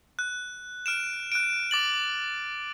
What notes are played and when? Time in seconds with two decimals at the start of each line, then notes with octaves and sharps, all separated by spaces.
0.19 F#6
0.86 F6 D7 E7
1.32 F#6 D7
1.71 D6 A6 F#7